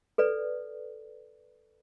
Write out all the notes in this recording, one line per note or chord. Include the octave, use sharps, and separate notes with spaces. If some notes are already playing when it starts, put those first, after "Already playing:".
A4 B4 D5